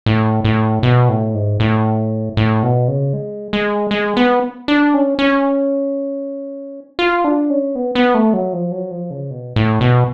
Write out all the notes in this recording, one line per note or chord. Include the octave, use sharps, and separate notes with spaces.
A2
A2
B2
A2
G#2
A2
A2
B2
C#3
G#3
G#3
G#3
B3
D4
C#4
C#4
F4
D4
C#4
B3
B3
A3
F#3
F3
F#3
F3
C#3
B2
A2
B2